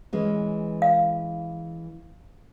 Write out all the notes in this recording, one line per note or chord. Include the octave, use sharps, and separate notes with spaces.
E3 G#3 C#4
F5